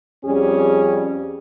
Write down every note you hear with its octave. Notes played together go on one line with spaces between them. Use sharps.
F2 G3 C#4 G#4